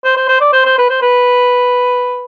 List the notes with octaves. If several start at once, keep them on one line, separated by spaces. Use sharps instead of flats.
C5
C5
C5
D5
C5
C5
B4
C5
B4